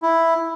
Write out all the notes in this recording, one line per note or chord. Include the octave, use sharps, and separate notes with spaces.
E4